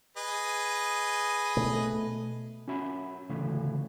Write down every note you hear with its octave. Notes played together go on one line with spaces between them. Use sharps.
G#4 B4 D#5
B2 A3
C#4 F#4 E5 B5
D2 A2 C#3 E3 A3